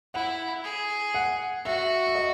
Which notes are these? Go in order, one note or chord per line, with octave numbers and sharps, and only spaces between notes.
E4 F#5
G#4
F#5
F#4 E5
E5
D#5